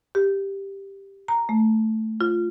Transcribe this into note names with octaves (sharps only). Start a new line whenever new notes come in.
G4
A#5
A3
F4